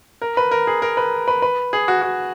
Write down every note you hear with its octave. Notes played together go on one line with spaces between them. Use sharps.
A#4
B4
A#4
G#4
A#4
B4
B4
B4
G#4
F#4
F#4